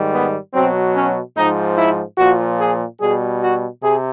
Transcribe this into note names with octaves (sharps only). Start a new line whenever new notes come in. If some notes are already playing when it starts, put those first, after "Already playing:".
Already playing: G#2 D#3 G3
B3
B2 F#3 C4
C#4
G#2 F3 D#4
E4
A#2 F3 F#4
G#4
B2 G3 G#4
F#4
C3 G#4